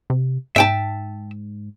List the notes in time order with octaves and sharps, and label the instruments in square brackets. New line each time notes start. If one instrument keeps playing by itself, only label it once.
[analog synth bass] C3
[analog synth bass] G#2 [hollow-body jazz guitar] E5 G5 A5